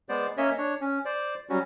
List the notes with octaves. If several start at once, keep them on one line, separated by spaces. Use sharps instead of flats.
G#3 B3 C5 D5
A#3 C#4 C#5 D#5 E5
D4 C#5
C#4
C5 D5
F#3 G3 C#4 F#4